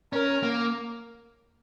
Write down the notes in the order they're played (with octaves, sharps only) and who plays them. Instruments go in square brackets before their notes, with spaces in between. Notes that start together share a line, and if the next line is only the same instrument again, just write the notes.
[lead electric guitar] C#4 [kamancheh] A#4
[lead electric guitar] A#3